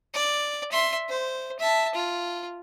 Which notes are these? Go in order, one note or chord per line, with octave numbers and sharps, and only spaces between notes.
D5
E5 C6
C5
E5 A5
F4